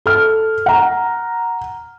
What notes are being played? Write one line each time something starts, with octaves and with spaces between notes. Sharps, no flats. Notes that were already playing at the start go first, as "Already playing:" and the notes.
A4 F6
F#5 A#5